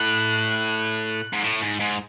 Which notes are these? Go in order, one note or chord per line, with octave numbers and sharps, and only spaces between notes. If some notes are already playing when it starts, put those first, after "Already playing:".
Already playing: A2 F#6
G#2
A2
G#2
G#2